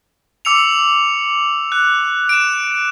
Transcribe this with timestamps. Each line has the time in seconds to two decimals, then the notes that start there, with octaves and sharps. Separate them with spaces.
0.45 D6 E6 C#7 F7
1.72 F#6
2.29 D7 E7